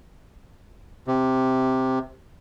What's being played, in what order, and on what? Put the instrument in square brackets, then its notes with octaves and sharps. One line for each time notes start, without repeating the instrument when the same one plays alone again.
[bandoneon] C3